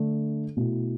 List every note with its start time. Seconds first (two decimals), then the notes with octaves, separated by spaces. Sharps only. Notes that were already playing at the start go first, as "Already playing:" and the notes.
Already playing: D3 A3 D4
0.57 B2 A3 E4